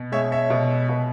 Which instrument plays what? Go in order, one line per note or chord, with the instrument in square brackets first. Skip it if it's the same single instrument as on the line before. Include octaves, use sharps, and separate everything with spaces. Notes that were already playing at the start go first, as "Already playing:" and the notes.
Already playing: [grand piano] B2
G#3 C#5 E5
C#5 E5
B2
B2